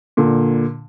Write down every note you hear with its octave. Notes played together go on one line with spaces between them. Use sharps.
A#2 D3